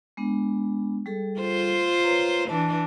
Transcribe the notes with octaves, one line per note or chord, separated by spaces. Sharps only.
G#3 B3 D4
G3 G#4 A4
F4 C5
B4 C#5 A#5
E3 D4 A5